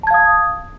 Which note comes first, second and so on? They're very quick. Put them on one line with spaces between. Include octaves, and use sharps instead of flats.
A5 G#6 F5 D#6